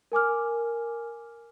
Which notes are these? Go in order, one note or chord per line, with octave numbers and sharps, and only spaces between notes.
A#4 G#5 D6 F6